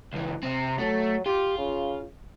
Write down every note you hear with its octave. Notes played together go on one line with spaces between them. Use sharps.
C#2 E3
C3 C4
F#3 A3
F4 G4
C#3